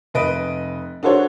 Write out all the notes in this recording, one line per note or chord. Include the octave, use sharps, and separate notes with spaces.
F1 B4 D#5 D7
D4 F#4 A4 C5 C#5